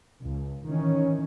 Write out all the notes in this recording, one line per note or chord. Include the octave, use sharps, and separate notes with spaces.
C#2
D#3 E3 C#4